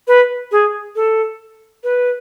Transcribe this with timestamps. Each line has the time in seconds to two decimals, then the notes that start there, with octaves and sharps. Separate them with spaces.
0.08 B4
0.52 G#4
0.96 A4
1.84 B4